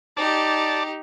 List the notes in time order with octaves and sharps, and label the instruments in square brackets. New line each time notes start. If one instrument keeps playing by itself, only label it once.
[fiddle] D#4 G4 [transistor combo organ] D5 A5